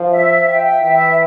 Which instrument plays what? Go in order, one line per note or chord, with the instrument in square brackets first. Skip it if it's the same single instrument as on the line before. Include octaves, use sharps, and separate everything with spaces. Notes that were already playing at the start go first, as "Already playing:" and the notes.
Already playing: [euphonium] F3
[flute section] E5
G5
[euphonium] E3 [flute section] E5